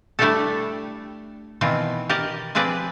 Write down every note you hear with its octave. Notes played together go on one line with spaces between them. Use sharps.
G3 A3 D4 E4 G4 A4
B2 D#3 E3 C4 F4
G4 A#4 D5 D#5
F3 C4 G#4 B4 D5